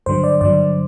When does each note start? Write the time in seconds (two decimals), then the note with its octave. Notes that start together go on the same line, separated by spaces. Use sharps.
0.06 G2 D3 F#3 C5
0.24 D5
0.41 G2 D3 F#3 D5